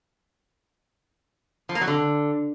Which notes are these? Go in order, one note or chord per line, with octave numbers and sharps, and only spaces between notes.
F3
A#3
F#3
D3